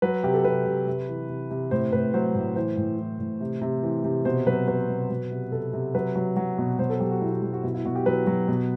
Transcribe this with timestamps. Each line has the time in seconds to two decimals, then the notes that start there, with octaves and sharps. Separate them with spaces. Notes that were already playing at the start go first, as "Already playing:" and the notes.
0.02 F#3 B4
0.23 C3 G4
0.34 A4
0.45 C3 B4
0.66 C3
0.87 C3
1.08 E3
1.29 C3
1.50 C3
1.71 A2 C5
1.92 A2 B4
2.14 F#3 C5
2.35 A2
2.56 E3 C5
2.77 A2
2.99 E3
3.19 A2
3.40 C3
3.62 C3
3.83 E3
4.04 C3
4.25 B2 C5
4.47 F#3 B4
4.68 F#3 B4
4.89 B2
5.10 F#3
5.31 C3
5.52 C3 A4
5.73 C3
5.94 F#3 B4
6.16 F#3
6.36 F#3
6.58 B2
6.79 F#3 C5
6.90 A4
7.00 F#3 G4
7.11 F#4
7.21 B2 E4
7.32 E4
7.42 F#3 F#4
7.53 F#4
7.63 B2 E4
7.75 E4
7.85 B2 F#4
7.95 G4
8.06 F#3 B4
8.27 F#3
8.48 B2